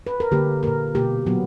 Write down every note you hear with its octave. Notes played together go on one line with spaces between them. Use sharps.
B4
A#4
D3 A#3 G4
A#2 A#3 A#4
B2 A#3 G4
A#2 F#3 B3